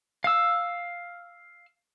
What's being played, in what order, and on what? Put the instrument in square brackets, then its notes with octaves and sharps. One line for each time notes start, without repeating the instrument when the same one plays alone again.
[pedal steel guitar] F5 E6